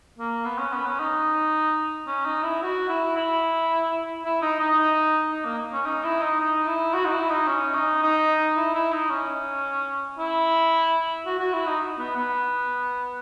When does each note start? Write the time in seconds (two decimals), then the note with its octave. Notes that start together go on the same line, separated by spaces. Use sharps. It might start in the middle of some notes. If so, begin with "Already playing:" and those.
0.19 A#3
0.45 B3
0.59 C#4
0.73 B3
0.86 C#4
1.00 D#4
2.07 C#4
2.26 D#4
2.43 E4
2.62 F#4
2.89 E4
3.16 E4
4.25 E4
4.42 D#4
4.60 D#4
5.32 D#4
5.45 A#3
5.73 C#4
5.86 D#4
6.04 E4
6.21 D#4
6.40 D#4
6.67 E4
6.94 F#4
7.05 D#4
7.12 E4
7.30 D#4
7.48 C#4
7.75 D#4
8.03 D#4
8.57 E4
8.75 E4
8.93 D#4
9.11 C#4
10.19 E4
11.26 F#4
11.39 F#4
11.53 E4
11.66 D#4
11.99 B3
12.16 B3